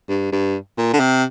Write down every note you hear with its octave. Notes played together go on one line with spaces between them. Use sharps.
G2
G2
A#2
D3
C3